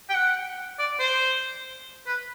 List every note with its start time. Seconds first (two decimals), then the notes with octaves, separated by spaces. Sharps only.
0.09 G5
0.14 F#5
0.79 D5
0.99 C5
2.06 B4